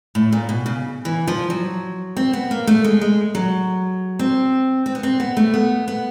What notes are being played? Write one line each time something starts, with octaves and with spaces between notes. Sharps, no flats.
A2
A#2
B2
C#3
E3
F3
F#3
C4
B3
A#3
A3
G#3
G#3
F#3
C4
C4
B3
C4
B3
A3
B3
B3